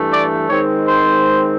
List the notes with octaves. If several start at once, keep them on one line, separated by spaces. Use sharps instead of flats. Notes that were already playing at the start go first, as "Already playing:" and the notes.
Already playing: G2 E3 A3
D5
D#3 G#3 C4 C#5
C5